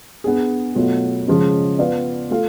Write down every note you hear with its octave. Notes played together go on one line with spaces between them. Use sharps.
B3 D4 G#4
B2 F#3 A3 F4
C#3 F3 G#3 C#4
B3 F4 B4 D5 F5
A3 F4 A4 F5